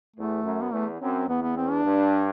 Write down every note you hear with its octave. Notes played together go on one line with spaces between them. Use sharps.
E2 A3
F#2
B3
E2 A3
F#2 C4
E2 B3
B3
C4
D4
G2